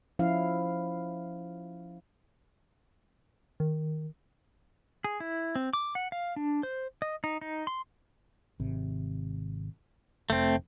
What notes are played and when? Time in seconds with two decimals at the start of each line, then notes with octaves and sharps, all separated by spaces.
0.19 F3 C#4 E4 F5
3.60 D#3
5.04 G#4
5.20 E4
5.55 C4
5.73 D6
5.95 F#5
6.12 F5
6.36 D4
6.63 C5
7.02 D#5
7.24 D#4
7.41 D#4
7.67 C6
8.60 G#1 C3
10.30 F1 A3 C4